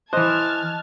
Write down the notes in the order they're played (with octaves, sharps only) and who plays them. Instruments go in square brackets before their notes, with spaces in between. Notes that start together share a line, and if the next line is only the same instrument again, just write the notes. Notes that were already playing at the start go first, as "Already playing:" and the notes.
[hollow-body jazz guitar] E3 C5 [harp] D#5 [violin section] A5 F6 G#6 [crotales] F#6